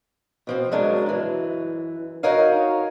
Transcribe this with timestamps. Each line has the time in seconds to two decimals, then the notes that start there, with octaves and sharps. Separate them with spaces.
0.47 B2 F3 C4
0.72 C#3 F#3 G#3 D4 A#4
1.06 F#2 E3
2.23 D#4 F#4 A#4 C#5 D#5 F5